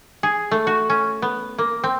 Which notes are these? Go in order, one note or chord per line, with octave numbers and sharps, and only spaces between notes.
G#4
A3
F#4
C#4
B3
A#3
C4